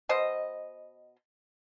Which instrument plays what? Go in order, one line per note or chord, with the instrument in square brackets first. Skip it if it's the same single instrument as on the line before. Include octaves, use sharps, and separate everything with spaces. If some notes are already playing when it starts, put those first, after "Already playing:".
[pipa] B2 C5 D#5